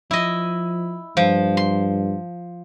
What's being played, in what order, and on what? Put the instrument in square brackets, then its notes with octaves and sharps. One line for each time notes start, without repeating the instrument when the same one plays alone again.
[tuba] F3 [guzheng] E4 D#5
[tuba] G2 [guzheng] F3
[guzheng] C6